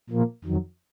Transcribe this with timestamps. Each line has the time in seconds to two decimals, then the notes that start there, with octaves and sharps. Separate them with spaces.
0.10 A#2 F3 A#3
0.44 F2 D#3 F#3